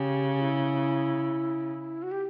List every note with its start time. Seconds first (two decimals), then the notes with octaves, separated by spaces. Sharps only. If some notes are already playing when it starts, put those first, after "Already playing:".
Already playing: C#3 G4
0.41 E4
2.03 F#4
2.11 G4